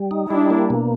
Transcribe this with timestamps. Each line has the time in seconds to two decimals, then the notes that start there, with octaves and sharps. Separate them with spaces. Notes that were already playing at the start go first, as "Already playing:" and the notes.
Already playing: G3
0.11 D#4
0.30 G3 D4 E4
0.50 A#3
0.70 B2